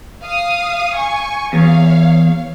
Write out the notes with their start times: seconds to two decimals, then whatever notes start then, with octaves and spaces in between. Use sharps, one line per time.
0.23 F5 D#6
0.95 G#5 C#6
1.53 E2 C#5 F5